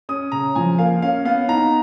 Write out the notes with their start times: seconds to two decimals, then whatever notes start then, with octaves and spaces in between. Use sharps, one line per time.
0.09 C#4 D#6
0.32 C#3 A#5
0.55 F3 G#5
0.78 A#3 F5
1.02 C#4 F5
1.25 B3 F5
1.48 D#4 A#5